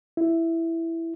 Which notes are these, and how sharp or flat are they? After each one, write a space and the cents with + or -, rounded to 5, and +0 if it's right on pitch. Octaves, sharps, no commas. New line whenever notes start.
E4 +5